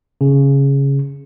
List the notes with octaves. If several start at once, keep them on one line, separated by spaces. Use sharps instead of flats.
C#3